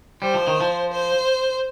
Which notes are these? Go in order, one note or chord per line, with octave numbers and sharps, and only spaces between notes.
G3 C5
F3
D#3
F3
C5